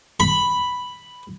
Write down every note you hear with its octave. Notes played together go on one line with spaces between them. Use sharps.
B5